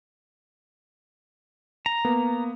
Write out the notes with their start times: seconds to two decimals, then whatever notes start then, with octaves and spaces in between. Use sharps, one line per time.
1.86 A#5
2.05 A#3 B3